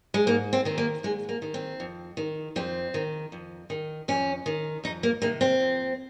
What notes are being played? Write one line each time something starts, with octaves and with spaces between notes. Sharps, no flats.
G#3
G#2 A#3
C4
D#3 C4
A#3
G#2 G#3
A#3
D#3
C4
F2
D#3
F2 C4
D#3
F2
D#3
F2 C#4
D#3
F2 D#4
A#3
C3 D#3 A#3
C4
F2